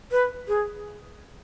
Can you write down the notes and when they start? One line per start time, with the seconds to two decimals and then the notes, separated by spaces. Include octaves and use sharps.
0.12 B4
0.48 G#4